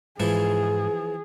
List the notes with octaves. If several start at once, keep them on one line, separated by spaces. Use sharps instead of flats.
G#2 E3 F3 E4 G#4